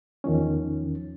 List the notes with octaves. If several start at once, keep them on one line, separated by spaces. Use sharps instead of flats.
E2 D#3 F3 C#4